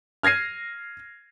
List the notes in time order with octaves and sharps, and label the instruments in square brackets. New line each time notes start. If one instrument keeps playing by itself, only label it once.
[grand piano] F6 G#6 A#6 C7 D#7